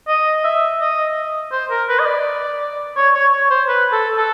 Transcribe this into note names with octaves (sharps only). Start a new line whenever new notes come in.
D#5
E5
D#5
C5
A#4
B4
D#5
D5
C#5
C#5
C#5
C5
B4
A4
A4